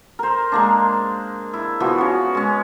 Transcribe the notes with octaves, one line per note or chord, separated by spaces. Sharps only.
A#4 C5
G#3 A#3 D4
E4
E3 F3 B3 F#4
C#4 F#4
G#3 C#4